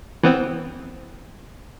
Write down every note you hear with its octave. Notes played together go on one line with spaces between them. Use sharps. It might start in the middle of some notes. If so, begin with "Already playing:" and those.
E3 B3 C4